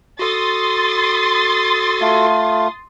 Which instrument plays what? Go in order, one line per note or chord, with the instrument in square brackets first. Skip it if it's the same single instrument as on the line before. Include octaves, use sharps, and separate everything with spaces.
[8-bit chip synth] F#4 A4 [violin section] C6 D#6 A6
[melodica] A3 F4